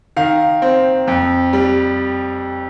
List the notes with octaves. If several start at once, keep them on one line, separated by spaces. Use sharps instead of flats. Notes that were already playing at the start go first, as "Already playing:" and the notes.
D#3 F5
C4
F2
G3